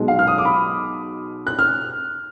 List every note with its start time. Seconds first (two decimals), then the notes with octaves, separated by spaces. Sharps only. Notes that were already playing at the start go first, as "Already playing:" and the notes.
Already playing: B1 B2 G#3
0.08 F5
0.19 F6
0.27 D#6
0.38 D6
0.45 B5
1.47 F#6
1.59 F6